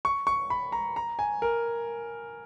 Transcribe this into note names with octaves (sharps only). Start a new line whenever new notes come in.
C#6
C#6
B5
A#5
A#5
G#5
A#4